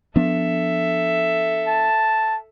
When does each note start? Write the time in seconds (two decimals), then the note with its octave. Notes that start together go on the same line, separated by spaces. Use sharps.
0.16 F3 B3 D4 A4 E5
1.67 A5